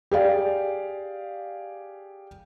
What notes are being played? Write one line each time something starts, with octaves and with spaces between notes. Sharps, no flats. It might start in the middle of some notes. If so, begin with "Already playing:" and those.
G4 G#4 D5 F5